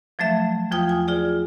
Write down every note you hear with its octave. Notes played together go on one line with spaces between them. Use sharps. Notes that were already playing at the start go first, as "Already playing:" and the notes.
F3 F#3 A3 E5
E2 F3 F4 G5 D#6
G#5
F4 G#4 D5